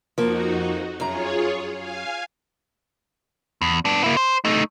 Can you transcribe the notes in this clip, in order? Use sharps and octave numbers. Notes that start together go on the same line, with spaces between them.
F2 F3 A#3 D#4 F#4
F#2 F4 G#4 C#5 A#5
F5 G#5
E2
B3 D4
A#3 E4
C5
A3 D#4